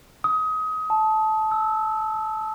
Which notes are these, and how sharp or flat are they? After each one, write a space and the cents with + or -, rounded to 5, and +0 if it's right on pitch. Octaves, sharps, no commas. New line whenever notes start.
D#6 +25
A5 -15
E6 -10